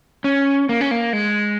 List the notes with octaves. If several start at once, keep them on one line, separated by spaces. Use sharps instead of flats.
C#4
A#3
C#4
A#3
G#3